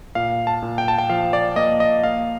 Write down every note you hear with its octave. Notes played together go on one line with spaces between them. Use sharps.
A#2 F5
A5
A#2
G5
A5
G5
F3 F5
D5
A#3 D#5
D#5
A#3 F5